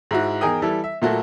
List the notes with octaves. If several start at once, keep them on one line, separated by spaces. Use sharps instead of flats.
G#2 E4 F#4
E2 D#4 G#4 A#4 G5 D#6
E3 G3 E4 A4
E5
A#2 F#3 A3 A#3 F#4 A4